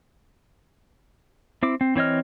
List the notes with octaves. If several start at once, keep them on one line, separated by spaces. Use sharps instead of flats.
C4 E4 D6
C4
E3 C4 C#5 D#5 F6